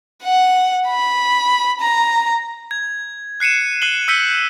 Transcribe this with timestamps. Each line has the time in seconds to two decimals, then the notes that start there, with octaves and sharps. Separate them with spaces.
0.24 F#5
0.88 B5
1.81 A#5
2.71 G#6
3.40 F#6 C7 C#7 D#7 E7
3.82 F#6 C7 D#7 F#7 G7
4.08 E6 G6 B6 C#7 D#7 G7